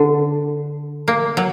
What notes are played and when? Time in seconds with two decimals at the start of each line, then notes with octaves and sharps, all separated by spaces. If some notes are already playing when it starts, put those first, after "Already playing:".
Already playing: D3
1.08 A#3
1.37 F#3